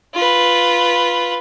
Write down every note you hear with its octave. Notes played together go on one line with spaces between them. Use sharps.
F4 B4